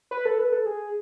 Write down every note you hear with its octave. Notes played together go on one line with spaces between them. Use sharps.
B4
A4
B4
A4
G#4